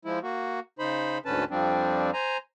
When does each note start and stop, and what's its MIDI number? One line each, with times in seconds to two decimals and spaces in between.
0.05 0.19 53
0.05 0.19 56
0.05 0.19 64
0.23 0.60 58
0.23 0.60 66
0.79 1.18 49
0.79 1.18 63
0.79 1.18 72
0.79 1.18 83
1.26 1.44 38
1.26 1.44 44
1.26 1.44 50
1.26 1.44 61
1.26 1.44 71
1.26 1.44 81
1.50 2.11 41
1.50 2.11 53
1.50 2.11 55
1.50 2.11 60
1.50 2.11 62
2.14 2.37 72
2.14 2.37 80
2.14 2.37 82